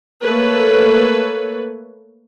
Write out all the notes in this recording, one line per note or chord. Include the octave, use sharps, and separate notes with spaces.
A3 A#3 A4 B4 C#5